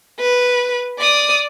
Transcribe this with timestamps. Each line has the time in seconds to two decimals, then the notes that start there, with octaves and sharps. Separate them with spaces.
0.20 B4
0.99 D5 D#6